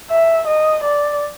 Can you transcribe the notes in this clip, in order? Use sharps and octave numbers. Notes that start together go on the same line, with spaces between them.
E5
D#5
D5